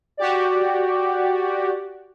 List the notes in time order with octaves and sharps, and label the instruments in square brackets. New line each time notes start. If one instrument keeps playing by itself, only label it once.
[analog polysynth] F#4 G4 D5